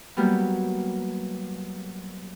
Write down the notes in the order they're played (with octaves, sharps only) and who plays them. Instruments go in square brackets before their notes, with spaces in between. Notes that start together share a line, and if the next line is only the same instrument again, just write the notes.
[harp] F#3 G3 A#3 B3 G4